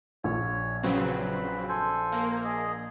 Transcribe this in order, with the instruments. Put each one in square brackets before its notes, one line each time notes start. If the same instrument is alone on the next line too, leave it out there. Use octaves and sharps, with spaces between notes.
[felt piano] A#1 [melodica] C#5
[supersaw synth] C#3 F#3 C4 [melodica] B4
[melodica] A4 C5 G#5
[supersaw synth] A#3
[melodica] G#4 D#5